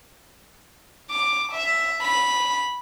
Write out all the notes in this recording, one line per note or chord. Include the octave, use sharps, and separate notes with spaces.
D6
E5
B5